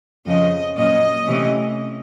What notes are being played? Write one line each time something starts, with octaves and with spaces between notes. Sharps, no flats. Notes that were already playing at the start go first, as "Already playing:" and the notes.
F2 C#3 F3 D#5
A#2 F#3 A#3 C#4 D#5
C3 E3 A3 C#4